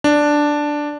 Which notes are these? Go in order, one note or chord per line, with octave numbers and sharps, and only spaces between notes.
D4